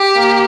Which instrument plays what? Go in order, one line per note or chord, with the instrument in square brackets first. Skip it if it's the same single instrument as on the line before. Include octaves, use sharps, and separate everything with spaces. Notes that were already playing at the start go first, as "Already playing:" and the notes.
Already playing: [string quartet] G4
A#3